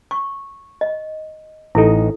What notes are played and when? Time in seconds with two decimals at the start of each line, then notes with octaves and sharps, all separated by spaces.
0.11 C#6
0.81 D#5
1.75 A1 D#4 E4 A4